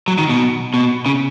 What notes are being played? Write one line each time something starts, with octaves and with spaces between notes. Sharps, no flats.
F#3
D#3
B2
B2
C#3